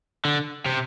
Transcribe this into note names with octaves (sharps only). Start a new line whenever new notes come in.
D3
C3